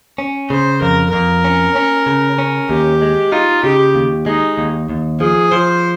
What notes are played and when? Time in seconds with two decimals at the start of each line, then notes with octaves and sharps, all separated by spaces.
0.18 C#4
0.50 C#3 C5
0.82 F2 A#4
1.12 F2 A#4
1.45 C#4
1.76 C#4
2.06 C#3
2.38 C#4
2.70 D#2 G4
3.02 G#3
3.32 D#4 F4
3.64 C#3 G4
3.95 D#2
4.26 G#3 D#4
4.58 D#2
4.89 D#2
5.20 F3 G#4
5.52 F3 C5